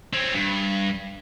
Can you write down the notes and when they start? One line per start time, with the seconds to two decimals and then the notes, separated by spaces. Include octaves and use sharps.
0.13 C4 C#4
0.34 G2